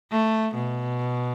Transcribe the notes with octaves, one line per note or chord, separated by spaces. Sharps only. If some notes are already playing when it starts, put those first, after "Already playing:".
A3
B2